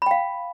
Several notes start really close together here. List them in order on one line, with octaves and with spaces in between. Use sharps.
B5 G5 F5